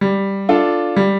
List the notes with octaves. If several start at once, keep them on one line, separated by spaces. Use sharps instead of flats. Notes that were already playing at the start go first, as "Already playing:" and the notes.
G3
D4 F4 A4
G3